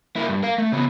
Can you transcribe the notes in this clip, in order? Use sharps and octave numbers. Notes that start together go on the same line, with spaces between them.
A#3 E4
G2
A#4 F5
A3
C#3 B3